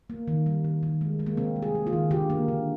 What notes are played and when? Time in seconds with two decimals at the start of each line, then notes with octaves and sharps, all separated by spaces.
0.10 A#3
0.28 D#3
0.46 G3
0.65 D#3
0.83 D#3
1.01 G#3
1.19 G#3
1.26 A#3
1.37 C3 C4
1.56 G3
1.62 G#4
1.75 A#3
1.87 F4
1.93 D#3
2.11 D3 G4
2.30 A#3
2.48 D3